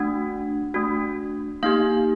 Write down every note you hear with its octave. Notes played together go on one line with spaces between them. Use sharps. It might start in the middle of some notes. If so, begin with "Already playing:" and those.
Already playing: A3 D4 F#4 F#5
A3 D4 F#4
A#3 D#4 G4 F5